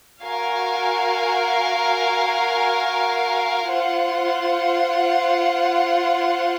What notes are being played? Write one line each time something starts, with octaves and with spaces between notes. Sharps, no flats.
F#4 A#4 F5 G#5
F4 C5 F#5